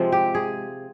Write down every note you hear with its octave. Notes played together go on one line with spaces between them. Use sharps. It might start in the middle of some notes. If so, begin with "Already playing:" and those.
Already playing: C3 F3 G#3 C4
G4
G#4